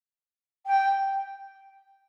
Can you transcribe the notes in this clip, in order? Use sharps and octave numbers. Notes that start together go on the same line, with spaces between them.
G5